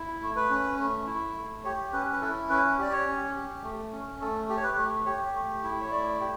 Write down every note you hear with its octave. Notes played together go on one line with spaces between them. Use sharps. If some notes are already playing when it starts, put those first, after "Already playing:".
Already playing: E4
A3
B4
C#4
A3
E4
A3
G4 C#5
C#4 B4
B4
E4 A4
C#4 B4
G4 D5
C#5
C#4
G4
A3
C#4
A3 A4
G4
C#5
B4
A3
G4 C#5
A3
E4
C#5
A3 D5
G4